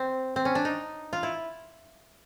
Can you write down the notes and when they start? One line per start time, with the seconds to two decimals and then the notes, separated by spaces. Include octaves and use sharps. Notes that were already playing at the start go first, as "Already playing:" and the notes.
Already playing: C4
0.36 C4
0.45 C#4
0.55 D4
0.65 D#4
1.13 F4
1.23 E4